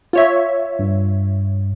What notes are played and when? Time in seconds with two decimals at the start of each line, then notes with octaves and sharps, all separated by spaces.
0.13 F4 C#5 E5
0.79 G2